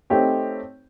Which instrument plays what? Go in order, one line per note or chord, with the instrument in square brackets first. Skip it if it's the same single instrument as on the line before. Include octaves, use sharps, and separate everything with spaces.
[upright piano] A3 C4 D#4 G4 C#5